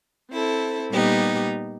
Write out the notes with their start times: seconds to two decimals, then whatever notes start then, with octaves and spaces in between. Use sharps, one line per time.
0.32 C4 E4 A4
0.91 A#2 G3 B3 D#4 G4